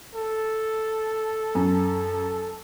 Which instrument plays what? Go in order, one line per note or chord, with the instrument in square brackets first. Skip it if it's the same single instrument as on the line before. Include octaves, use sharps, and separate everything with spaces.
[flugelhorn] A4
[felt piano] F#2